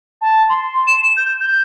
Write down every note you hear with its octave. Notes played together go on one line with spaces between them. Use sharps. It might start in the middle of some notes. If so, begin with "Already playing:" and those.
A5
C6
E7
G6
G6